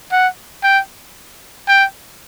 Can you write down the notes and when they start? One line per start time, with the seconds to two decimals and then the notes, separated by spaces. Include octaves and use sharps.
0.12 F#5
0.64 G5
1.69 G5